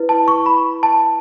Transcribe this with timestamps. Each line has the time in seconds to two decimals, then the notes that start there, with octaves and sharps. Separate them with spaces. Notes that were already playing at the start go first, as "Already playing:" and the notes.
Already playing: E4 B4
0.09 A5
0.28 C#6
0.46 B5
0.83 A5